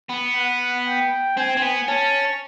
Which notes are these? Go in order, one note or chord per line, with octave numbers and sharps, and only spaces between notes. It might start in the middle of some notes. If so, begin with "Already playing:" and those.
B3
F#5
G5
C4 G#5
C4
B3
C#4 A5